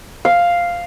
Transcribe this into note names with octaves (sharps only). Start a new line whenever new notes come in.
F5